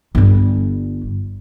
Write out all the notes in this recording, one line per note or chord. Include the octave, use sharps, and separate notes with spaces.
G1 G3